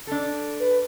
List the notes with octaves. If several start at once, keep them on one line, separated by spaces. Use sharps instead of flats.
D4 A4
B4